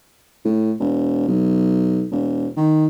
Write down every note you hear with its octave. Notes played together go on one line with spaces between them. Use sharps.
A2
E1
B1
E1
D#3